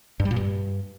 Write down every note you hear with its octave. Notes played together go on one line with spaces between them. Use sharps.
G2
G3
A#2
G2